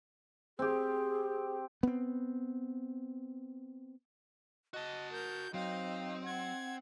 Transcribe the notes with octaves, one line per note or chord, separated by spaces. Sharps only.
C4 G4 G#4
B3 C4
F#4 D#5 A5
A#4 G6
F#3 C4 D#4 F5
F#5 G#6